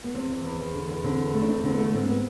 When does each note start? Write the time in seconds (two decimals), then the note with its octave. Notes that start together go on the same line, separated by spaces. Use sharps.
0.04 B3
0.15 E2 C4
0.30 E2
0.44 E2
0.59 E2
0.74 D3
0.89 E2
1.04 D3 C4
1.19 E2
1.26 C4
1.34 A3
1.42 D4
1.49 E2 C4
1.64 D3 C4
1.71 B3
1.78 A3
1.93 G#2 C4
2.08 B3